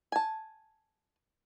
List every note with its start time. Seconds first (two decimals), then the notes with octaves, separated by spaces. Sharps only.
0.12 G#5 A5